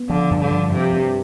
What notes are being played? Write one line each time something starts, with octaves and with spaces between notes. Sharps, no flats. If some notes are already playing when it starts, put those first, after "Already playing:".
Already playing: B3
D3 F3
G2
D3
F3
G2 C3
G2